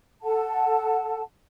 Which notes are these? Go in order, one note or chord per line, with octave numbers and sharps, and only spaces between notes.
A4 F#5 A5